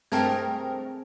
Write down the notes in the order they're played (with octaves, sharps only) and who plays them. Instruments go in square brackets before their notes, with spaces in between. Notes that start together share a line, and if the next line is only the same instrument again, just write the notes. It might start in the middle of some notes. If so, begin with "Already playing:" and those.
[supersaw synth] G2 A3 A#4 [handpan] C4 G#4 [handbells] G5 A5 G#6